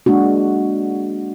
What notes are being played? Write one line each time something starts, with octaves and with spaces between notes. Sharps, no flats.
G#3 A#3 D4 F#4